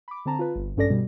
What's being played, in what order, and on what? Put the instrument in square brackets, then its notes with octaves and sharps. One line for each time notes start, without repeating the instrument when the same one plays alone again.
[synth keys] B5 D6
D3 C4 A5 A#5
F4 B4
G1
A#1 G2 C#4 A4 D5 A#6
B2 G3